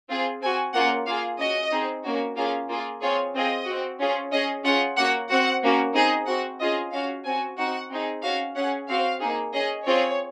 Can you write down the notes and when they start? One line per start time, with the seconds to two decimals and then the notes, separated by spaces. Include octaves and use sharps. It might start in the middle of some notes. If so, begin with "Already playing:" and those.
0.09 C4 F4 G#4
0.41 C4 F#4 G#5
0.73 A#3 C#4 F4 G#4 F#5
1.06 A#3 F4 G#4 F5
1.38 C#4 F#4 D#5
1.72 C4 D#4 G#4
2.04 A#3 C#4 F#4
2.36 A#3 C#4 F4 G#4 F5
2.69 A#3 F4 G#4
3.02 C4 F4 G#4 C#5
3.34 C4 F4 G#4 D#5
3.66 C4 F#4
4.00 C#4 F4 G#4
4.32 C#4 G#4 D#5
4.64 C#4 F4 G#4 F#5
4.97 A#3 C#4 F#4 F#5
5.29 C4 F#4 F#5
5.63 A#3 C#4 F#4
5.94 C4 D#4 G#4 D#5
6.27 C4 F#4 F#5
6.60 C#4 F4 G#4 D#5
6.92 C#4 F#4 F5
7.25 C4 F#4 G#5
7.58 C4 D#4 F#4 F#5
7.90 C4 D#4 G#4
8.22 C#4 F#4 F5
8.55 C#4 G#4 F#5
8.88 C4 F#4 F5
9.20 A#3 D#4 G#4
9.53 C#4 G#4 D#5
9.85 C4 F4 G#4 C#5